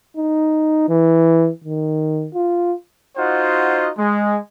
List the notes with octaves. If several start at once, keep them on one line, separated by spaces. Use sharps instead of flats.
D#4
E3
D#3
F4
D#4 F4 F#4 C5 D#5 F#5
G#3